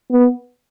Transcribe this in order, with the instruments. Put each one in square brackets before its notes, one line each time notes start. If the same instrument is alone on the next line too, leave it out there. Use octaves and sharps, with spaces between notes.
[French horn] B3